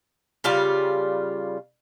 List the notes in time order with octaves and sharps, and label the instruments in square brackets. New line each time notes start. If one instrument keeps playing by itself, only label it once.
[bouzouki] C#3 G3 F4 D5